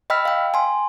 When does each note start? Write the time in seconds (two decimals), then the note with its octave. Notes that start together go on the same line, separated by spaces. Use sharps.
0.10 D#5 G5 B5 E6 F6 B6
0.25 F5 G5
0.54 G#5 C6